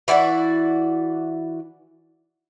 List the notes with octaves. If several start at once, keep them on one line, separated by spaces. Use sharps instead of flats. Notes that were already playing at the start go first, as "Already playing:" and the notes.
E3 E4 F#4 D5